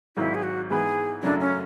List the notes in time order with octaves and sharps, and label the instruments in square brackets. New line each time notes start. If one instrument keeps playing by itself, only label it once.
[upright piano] G#1 G#2 F#3 [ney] E4
[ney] G#4
F#4
[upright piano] G#2 E3 B3 E4 B4 [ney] G#4
[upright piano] F#2 C#3 F#3 A3 E4 [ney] D4
[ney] C#4